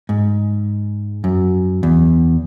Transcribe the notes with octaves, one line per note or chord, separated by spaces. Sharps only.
G#2
F#2
E2